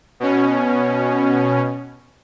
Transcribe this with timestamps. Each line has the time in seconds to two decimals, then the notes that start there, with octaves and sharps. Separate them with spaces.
0.20 B2 C#4